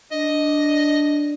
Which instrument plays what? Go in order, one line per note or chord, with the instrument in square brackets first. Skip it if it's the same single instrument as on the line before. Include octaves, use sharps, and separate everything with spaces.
[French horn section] D4 [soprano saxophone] D#5